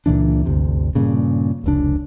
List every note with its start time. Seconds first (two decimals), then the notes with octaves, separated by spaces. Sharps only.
0.06 C#2 A#2 E3 D4
0.45 G1 D2 C3
0.95 G2 A#2 C#3
1.64 F1 C#2 D4